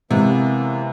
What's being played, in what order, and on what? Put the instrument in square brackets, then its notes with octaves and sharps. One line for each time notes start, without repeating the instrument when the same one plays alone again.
[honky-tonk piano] C3 [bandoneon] E3 A#3 B3 [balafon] G#3